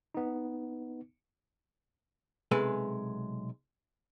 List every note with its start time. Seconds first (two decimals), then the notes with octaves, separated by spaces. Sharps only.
0.14 B3 D#4
2.51 B1 C3 G#3 A4 B4 G#5